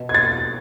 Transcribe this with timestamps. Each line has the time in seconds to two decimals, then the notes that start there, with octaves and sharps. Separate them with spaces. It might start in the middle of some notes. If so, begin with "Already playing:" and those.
Already playing: B2
0.09 G#6
0.14 A6